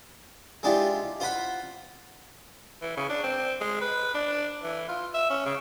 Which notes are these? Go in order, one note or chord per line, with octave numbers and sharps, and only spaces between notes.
G#3 D4 E4 F4 G4
F4 C5 F#5 B5
E3
C#3
D4
C4
G#3
B4
D4
E3
F4
E5
C#4
C#3